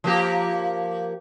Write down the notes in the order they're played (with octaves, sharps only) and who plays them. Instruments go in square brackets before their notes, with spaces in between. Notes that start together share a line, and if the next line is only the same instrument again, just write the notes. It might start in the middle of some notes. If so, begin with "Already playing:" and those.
[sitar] F3 A#3 G4